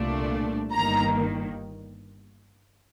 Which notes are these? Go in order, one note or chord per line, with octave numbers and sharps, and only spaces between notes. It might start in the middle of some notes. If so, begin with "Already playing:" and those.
Already playing: C2 A#2 A3 D4
G1 G2 D#3 A#3 A#5